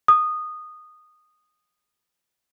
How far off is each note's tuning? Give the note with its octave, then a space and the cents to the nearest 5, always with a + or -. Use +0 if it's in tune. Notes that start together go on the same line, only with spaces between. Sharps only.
D#6 -15